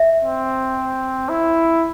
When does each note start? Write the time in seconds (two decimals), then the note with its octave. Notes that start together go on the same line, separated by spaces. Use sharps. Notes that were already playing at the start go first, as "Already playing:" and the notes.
Already playing: E5
0.24 C4
1.29 E4